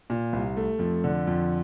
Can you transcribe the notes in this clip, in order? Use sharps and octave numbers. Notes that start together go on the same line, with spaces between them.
A#2
C2
A3
F2
D3
F2